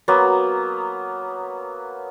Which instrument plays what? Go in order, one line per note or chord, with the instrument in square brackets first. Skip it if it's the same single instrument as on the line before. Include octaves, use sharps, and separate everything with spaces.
[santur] F#3 A#3 B3